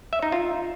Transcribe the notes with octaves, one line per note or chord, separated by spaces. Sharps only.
E5
D#4
F4